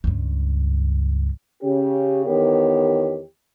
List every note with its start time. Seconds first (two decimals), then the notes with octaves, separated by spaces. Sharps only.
0.04 C#2 G2
1.62 C#3 C#4 G4
2.26 E2 D#3 B3 G4 A#4 C#5